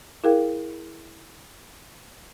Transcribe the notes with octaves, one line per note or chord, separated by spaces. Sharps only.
E4 G#4 A#4 F5 G5